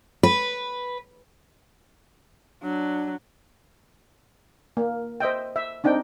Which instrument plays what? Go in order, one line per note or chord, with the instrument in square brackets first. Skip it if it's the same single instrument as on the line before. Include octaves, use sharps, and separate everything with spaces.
[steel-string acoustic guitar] B4
[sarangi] F#3 [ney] D4
[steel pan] A#3
C5 D#5 E5 G5
E5
C4 D4 D#4 G5